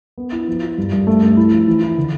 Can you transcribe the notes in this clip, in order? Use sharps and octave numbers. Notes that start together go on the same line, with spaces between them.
B3
E4
F3
F4
G2
G2
A3
A3
E4
F3
E3
E4
D3